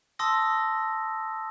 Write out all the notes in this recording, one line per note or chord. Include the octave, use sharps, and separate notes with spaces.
A5 C6 D#6 E6 A#6